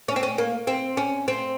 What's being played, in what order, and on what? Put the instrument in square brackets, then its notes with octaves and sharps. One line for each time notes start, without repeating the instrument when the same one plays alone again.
[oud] C#4
C4
C#4
A#3
C4
C#4
C4